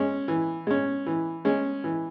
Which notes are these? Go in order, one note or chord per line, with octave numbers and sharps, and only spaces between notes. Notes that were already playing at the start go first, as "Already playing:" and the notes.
Already playing: G#3 C#4
E3
G#3 C#4
E3
G#3 C#4
E3